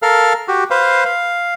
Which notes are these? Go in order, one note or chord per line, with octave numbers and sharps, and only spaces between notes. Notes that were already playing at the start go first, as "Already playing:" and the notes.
A4 A#4 F5 F6
F#4 G4
B4 C5 F5
F5